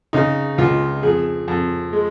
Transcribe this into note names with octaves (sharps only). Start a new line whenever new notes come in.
C#3 D#4
C#2 F4
F2 G#4
F2
G#3